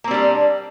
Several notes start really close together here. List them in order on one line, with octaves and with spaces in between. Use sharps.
A#3 C4 G3 D4